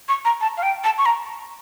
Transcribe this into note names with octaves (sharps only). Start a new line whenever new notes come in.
C#6
A#5
A5
F5
G5
A5
C#6
A#5